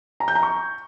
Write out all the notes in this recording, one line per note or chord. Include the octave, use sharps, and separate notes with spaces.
A#5
G6
A#5
C#6